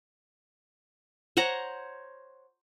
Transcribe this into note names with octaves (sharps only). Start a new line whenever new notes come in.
C5 C#5 F#5 A#5